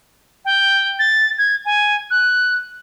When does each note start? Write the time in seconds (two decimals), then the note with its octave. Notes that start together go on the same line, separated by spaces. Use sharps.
0.45 G5
0.99 A6
1.38 G#6
1.65 G#5
2.10 F#6